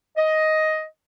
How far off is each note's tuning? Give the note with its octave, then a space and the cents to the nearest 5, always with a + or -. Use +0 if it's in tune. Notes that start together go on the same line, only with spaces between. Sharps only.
D#5 +10